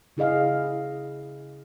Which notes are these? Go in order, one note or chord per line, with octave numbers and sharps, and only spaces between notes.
C#3 E4 G#4 D#5 F5